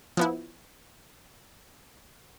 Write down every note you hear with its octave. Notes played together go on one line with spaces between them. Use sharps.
F3 B3 E4